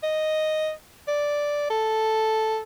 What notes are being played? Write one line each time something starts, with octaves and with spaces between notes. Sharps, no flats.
D#5
D5
A4